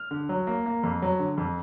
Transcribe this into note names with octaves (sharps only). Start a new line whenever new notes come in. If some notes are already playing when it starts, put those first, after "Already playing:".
Already playing: F6
D3
F#3
A#3
A#3
F2
F#3
D3
F2